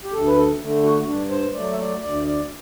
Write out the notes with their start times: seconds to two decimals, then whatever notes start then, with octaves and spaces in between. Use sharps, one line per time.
0.04 G4
0.12 D2 A4
0.26 B4
0.36 A4
0.60 D3 A3
0.83 F#4
1.07 G2 D4
1.30 C5
1.54 F#3 A3 D5
1.72 E5
1.78 D5
2.02 D2 D5
2.25 D5